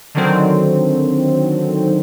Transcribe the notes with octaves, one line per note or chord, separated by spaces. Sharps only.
D3 D#3 F#3 C4